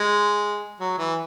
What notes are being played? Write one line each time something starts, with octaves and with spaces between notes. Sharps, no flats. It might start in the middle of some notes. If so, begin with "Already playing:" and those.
Already playing: G#3
F#3
E3